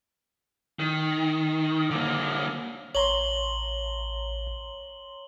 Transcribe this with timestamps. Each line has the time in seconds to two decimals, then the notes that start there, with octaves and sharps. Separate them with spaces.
0.79 D#3
1.91 D3 A#3
2.95 A1 C#5 A#5 C6 F#7 G7